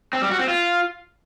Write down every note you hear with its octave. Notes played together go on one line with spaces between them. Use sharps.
C4
G3
F#4
C4
F4